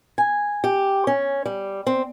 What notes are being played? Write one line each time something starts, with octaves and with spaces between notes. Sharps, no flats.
G#5
G4
C#4
G3
C4